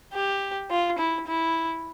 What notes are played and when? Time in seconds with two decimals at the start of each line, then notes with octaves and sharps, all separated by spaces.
0.13 G4
0.70 F4
0.98 E4
1.27 E4